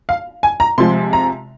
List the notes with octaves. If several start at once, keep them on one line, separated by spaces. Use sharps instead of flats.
F5
G#5
A#5
C3 F3 G#3 C6
A#5